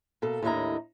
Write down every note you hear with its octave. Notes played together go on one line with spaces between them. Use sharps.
B2 A#3 A4
D#2 A2 D4 E4 D#5 A#5